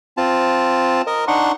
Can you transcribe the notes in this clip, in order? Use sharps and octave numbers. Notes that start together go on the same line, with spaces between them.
C4 F4 A5
A#4 D#5
D4 D#4 F#5 C6 C#6